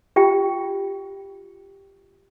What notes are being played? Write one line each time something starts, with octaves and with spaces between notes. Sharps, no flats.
F4 G4 G5